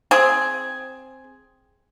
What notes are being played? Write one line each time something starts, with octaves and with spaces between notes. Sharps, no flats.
C4 G#4